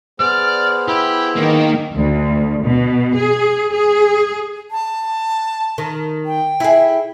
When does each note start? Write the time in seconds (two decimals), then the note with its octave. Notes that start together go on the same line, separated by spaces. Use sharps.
0.20 B3 G#4 C5 D5 F6
0.88 E4 G4
1.36 D#3 A#3
1.95 D2
2.63 B2
3.15 G#4
3.72 G#4
4.71 A5
5.78 D#3
6.25 G5
6.60 E4 G#4